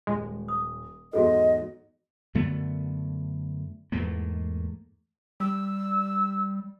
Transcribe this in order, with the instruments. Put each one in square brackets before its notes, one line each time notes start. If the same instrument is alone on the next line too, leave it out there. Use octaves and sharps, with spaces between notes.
[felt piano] D#1 [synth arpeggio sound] G#3
[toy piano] D#6
[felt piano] E2 G#2 F#3 [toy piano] F#4 G#4 A4 [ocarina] D#5
[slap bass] F#2 D3 A3 B3
E2 G#2 A3 A#3
[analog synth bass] G3 [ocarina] E6